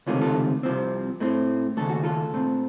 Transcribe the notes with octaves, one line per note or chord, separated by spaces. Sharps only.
C#2 C3 D#3 A3 C#4 F4
F4 A4
C2 C3 F3 C4
A2 A3 C4
D#2 C#3 A3 A4
F#4
F4 A4
A#2 A3 C4